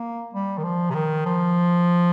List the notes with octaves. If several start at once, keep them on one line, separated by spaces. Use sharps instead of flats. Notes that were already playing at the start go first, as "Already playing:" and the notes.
Already playing: A#3
G3
D#3
F3
C3
D#3
F3